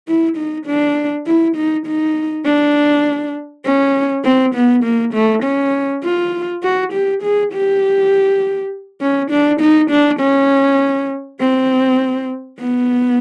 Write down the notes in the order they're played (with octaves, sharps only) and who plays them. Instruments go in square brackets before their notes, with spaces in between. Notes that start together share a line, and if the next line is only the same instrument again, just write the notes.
[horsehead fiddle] E4
D#4
D4
E4
D#4
D#4
D4
C#4
C4
B3
A#3
A3
C#4
F4
F#4
G4
G#4
G4
C#4
D4
D#4
D4
C#4
C4
B3